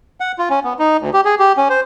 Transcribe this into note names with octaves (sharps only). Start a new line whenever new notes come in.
F#5
F4
C#4
B3
D#4
D2
G4
G#4
G4
C#4
C5